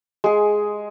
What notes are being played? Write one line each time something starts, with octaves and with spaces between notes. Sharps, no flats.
G#3 G#4